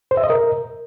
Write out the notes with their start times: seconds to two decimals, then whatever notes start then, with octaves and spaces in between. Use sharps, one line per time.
0.11 C5
0.17 E5
0.24 D#5
0.30 A#4